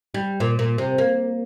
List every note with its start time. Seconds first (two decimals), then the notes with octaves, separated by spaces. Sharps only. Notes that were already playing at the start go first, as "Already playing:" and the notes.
0.14 G3
0.40 A#2
0.59 A#2
0.78 C3
0.98 A#3